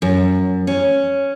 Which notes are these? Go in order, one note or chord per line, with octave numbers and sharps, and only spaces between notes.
F#2
C#4